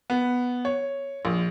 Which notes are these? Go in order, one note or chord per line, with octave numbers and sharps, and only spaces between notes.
B3
C#5
A#1